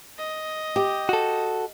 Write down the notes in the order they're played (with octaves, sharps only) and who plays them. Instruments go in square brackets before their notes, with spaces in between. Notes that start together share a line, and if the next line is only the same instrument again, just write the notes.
[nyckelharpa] D#5
[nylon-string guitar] G4
[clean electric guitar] F#4 A4